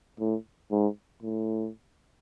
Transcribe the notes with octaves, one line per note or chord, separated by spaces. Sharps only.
A2
G#2
A2